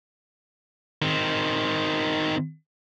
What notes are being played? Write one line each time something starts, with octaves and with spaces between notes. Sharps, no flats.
D#3 C4